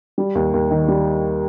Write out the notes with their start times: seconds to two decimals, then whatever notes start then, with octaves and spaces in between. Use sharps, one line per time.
0.18 G3
0.35 D#2
0.54 D#2
0.71 D#3
0.88 G3